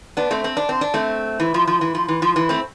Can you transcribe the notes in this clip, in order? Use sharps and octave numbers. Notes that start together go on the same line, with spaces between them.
B3 D4
A3 C4
C4
D4
C4
D4
A3 C4
E3
F3
F3
E3
F3
E3
F3
E3
A3 C4